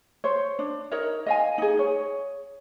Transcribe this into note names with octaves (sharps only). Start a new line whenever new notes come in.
C5 C#5
D4
D#4 A#4 C#5
D#5 F5 G#5
D#4 G#4
G#4 C#5